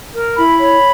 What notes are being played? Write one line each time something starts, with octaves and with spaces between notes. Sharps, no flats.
A#4
E4 B5
C#5